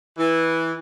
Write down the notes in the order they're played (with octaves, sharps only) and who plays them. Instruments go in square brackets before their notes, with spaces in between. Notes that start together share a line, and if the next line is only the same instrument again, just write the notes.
[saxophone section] E3